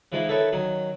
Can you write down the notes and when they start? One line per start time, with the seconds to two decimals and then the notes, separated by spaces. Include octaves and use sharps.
0.12 E3 F3 G#3 D#4 E4
0.28 D#3 A4 B4 C#5 E5
0.52 D#3 F#3 C#4